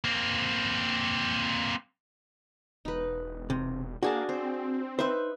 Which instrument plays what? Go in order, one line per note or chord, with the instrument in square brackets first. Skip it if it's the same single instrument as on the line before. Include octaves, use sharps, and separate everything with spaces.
[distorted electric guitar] A#3 C4
[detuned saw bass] E1 [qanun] D#4 B4
[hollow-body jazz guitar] C3
[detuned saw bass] A#3 [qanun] D4 G#5 A5 [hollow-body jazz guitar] F#4 G#4
[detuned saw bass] C4 [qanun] C5
[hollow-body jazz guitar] D#4 C5 [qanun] B4 E5